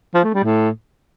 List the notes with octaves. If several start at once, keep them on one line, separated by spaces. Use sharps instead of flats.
F3
A3
G3
A2